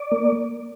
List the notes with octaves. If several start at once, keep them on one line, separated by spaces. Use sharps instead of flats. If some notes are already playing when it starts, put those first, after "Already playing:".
Already playing: D5
A#3